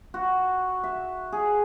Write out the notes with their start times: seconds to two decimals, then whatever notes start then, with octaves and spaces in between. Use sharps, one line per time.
0.14 F#4
0.84 E5
1.33 G#4